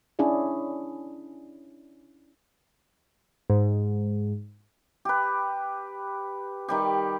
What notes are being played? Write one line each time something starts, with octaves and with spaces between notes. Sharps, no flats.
C#4 D4 E4 G#4 D5
G#2
G4 B4
D#3 G3 G4